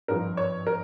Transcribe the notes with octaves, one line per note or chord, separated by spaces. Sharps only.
G#1 G2 F3 A#4
C#5
A#4